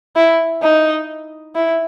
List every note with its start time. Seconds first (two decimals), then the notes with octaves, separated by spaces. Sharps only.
0.16 E4
0.62 D#4
1.56 E4